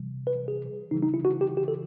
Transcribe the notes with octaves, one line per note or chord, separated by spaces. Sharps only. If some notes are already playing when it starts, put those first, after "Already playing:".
Already playing: C3 E3 G3
B4
G#4
C#3 E3 G3 D#4
D#4
E4
F#4
G4
G4
A4